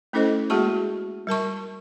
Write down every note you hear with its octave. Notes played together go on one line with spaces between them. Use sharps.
A3 C#4 E4 A4 C5 D#5
G#3 A#3 F#4 G#4 A5 C#6
G3 A#4 A5 C#6